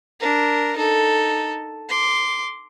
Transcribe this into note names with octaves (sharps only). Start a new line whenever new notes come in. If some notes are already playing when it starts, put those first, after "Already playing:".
D4 A#4
D#4 A4
C6 D6